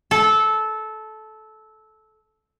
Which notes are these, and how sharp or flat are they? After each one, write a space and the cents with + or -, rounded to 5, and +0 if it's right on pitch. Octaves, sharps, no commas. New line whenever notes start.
A4 -15